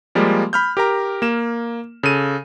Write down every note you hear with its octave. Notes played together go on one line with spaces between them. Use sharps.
F3 G3 G#3 A#3
B5 F6 G6
G4 A#4 A#5
A#3 E7
C#3 A4 D#7